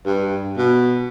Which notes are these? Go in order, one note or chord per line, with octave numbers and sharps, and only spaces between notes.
G2
B2